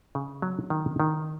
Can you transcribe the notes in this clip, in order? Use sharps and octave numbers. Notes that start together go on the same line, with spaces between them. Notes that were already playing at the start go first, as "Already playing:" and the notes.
C#3
F#3
D#3
D#3